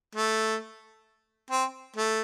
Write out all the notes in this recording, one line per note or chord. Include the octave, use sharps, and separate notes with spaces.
A3
C4
A3